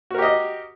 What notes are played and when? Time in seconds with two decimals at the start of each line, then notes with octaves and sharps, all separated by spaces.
0.11 F#4
0.14 A#4
0.18 G4
0.22 D#5